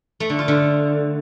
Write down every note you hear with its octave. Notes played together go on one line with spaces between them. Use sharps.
A3
D3
F4
D3